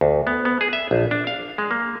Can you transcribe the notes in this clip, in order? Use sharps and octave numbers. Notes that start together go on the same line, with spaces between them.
D2
B3
B3
G#4
E5
A#1
D4
F5
G#3
A#3